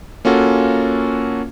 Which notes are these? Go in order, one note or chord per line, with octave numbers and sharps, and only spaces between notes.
A#3 C#4 F4 F#4 A4